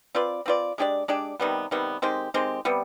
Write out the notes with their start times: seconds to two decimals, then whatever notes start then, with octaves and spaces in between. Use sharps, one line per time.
0.15 C4 F4 B4 D5
0.46 C4 F4 B4 D5
0.78 G#3 D4 G4 D5
1.08 G#3 D4 G4 D5
1.40 C3 D#3 G3 B3
1.71 C3 D#3 G3 B3
2.02 D#3 G#3 C4 G4
2.34 D#3 G#3 C4 G4
2.65 C3 G3 B3